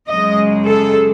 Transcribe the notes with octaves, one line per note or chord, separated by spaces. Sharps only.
F#2 C#3 G#3 D#5
A4